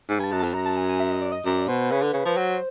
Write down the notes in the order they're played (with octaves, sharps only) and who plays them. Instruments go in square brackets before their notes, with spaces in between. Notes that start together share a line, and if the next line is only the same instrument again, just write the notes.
[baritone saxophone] G#2
[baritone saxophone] G2 [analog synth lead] G#5
[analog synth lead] A5
[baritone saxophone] F#2
[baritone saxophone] F2 [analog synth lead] A5
[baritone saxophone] F#2 [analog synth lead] A#5
[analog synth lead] A5
G#5
G#5
E5
D#5
D5
D#5
[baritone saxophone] F#2 [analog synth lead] D5
[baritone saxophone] B2 [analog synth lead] C5
[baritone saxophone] C#3 [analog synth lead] B4
[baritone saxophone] D3
C#3
[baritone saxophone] F3 [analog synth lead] B4
[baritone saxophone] F#3 [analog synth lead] C5